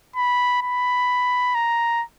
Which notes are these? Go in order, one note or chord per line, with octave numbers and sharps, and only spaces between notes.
B5
B5
A#5